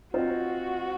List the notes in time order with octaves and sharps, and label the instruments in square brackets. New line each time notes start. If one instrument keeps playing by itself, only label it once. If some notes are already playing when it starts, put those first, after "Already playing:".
[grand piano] C4 F4 C5 D#5 [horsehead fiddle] F#4